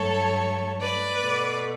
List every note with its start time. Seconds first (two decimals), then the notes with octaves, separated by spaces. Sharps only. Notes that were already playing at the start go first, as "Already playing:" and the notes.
Already playing: G2 F#3 A3 A4 C#5
0.80 B4 D5
1.21 B2 A3